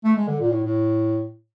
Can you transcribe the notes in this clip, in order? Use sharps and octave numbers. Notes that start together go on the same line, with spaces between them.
A3
G#3
D3
A#2
A2
A2